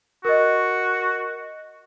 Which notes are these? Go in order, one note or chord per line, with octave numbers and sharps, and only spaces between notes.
F#4 A#4 D#5